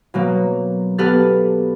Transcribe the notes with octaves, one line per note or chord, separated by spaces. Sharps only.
B2 F#3 A#3
B3 G4 A4 B4 F6 A6